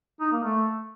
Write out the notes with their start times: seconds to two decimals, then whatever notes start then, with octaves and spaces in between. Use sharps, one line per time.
0.20 D#4
0.32 A#3
0.44 A3